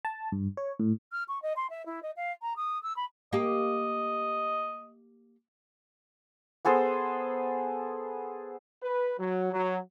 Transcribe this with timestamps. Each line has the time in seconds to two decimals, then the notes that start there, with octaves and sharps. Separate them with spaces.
0.05 A5
0.32 G2
0.57 C#5
0.79 A2
1.12 F6
1.28 C#6
1.42 D#5
1.56 C6
1.70 E5
1.86 E4
2.02 D#5
2.16 F5
2.42 A#5
2.56 D#6
2.83 E6
2.96 B5
3.33 A#3 G4 D#5
6.65 B3 G#4 A4 C5
8.81 B4
9.17 F#3
9.52 F#3